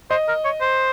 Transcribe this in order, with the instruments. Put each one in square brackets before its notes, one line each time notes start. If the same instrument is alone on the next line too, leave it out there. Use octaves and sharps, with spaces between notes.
[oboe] C5 [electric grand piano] D#5
[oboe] A#4
C#5
C5